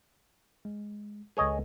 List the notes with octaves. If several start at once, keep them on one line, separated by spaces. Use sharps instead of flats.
G#3
C#2 G#4 A4 B4 C#5 D#5